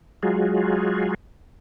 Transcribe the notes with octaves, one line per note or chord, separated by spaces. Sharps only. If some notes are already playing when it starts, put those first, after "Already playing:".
F#3 G#3 F4 F#4 G#4